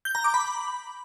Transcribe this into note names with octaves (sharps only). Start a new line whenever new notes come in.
G6
A#5
D6
B5